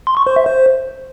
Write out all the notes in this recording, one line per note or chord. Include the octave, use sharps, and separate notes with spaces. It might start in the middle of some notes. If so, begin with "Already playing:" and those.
C6
C#6
C5
E5
C5